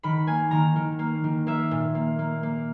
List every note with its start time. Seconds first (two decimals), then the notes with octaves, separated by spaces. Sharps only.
0.03 D#3 B5
0.27 A#3 G#5
0.51 D#3 A#5
0.76 D#3
0.99 A#3
1.24 D#3
1.47 A#3 E5
1.71 A#2
1.95 A#3
2.19 A#3
2.43 A#3